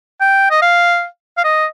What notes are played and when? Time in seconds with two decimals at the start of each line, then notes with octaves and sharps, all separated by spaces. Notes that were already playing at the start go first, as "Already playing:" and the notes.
0.21 G5
0.50 D#5
0.62 F5
1.37 F5
1.44 D#5